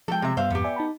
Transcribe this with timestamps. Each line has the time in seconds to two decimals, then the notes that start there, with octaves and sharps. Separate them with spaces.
0.08 F3 G#3 A4 G5
0.22 C3 E5
0.37 G2 G3 B3 C5 E5 F5
0.50 F2 G#2 B3 G4
0.64 D5 E5 G#5
0.76 D#4 A5 B5